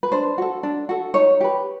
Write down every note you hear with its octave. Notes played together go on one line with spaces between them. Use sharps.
B4
D4 C5
F#4 A4
D4
F#4 A4
D#4 C#5
G4 B4